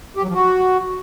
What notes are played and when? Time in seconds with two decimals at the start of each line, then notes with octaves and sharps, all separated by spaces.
0.17 G4
0.23 F#3
0.29 F3
0.35 F#4